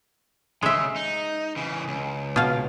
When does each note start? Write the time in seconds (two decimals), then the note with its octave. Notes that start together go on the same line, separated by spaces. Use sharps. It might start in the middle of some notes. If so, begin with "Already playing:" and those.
0.63 C#3 G#3 E5
0.96 D#4
1.56 C#3 E3
1.88 C#2
2.36 B2 F5